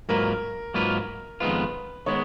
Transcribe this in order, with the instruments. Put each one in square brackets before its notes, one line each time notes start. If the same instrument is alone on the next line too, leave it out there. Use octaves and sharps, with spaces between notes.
[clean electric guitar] G#2 F#3 A#3 F4 B4 [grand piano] A#4
[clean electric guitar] G#2 F#3 A#3 F4 B4
[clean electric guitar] F2 D#3 G#3 B3 F4 [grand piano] B4
[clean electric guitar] D#3 G#3 B3 [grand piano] C#5